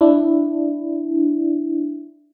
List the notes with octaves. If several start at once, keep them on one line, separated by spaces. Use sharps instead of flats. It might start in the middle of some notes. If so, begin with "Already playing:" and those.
D4 E4